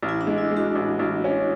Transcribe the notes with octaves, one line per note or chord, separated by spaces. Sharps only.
A1
E4
D4
G#3
E4
G#3
F#4
A1
A1
C#4